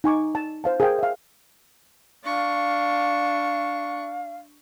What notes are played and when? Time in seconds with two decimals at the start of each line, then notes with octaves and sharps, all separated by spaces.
0.04 D#4 G#5 C#6 D6
0.35 A5
0.64 C5 F5 A5
0.80 G#4 A#4 C5 F5 G5
0.99 E5 F5
2.24 D4 F5 C#6